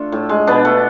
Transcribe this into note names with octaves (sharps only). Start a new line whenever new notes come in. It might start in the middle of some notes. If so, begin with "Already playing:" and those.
Already playing: A3 D4 F4
A2
G#3
B2 B3 D4
A3